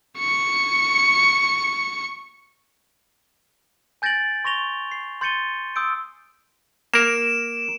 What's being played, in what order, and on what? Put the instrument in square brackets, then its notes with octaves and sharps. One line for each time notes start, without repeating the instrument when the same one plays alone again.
[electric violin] C#6 C#7
[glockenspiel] G#5 G6 A6 A#6 D7 F#7
C6 C#6 A#6 F7 G7
C7
C6 G6 A6 C#7 D#7 G7
C6 D#6 E6 G6 D7
[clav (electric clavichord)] A#3 A#4 [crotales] D7 E7